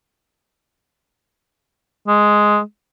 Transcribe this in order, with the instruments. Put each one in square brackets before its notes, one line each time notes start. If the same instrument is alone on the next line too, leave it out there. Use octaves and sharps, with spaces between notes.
[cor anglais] G#3